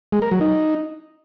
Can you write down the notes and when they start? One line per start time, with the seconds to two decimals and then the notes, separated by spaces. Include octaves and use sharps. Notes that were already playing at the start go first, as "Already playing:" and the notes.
0.12 G#3
0.22 A#4
0.31 F#3
0.41 D#4